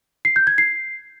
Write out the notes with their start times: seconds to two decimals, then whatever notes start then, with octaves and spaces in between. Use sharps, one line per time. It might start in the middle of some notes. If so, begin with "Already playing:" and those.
0.25 C7
0.36 G6
0.47 G#6
0.58 C7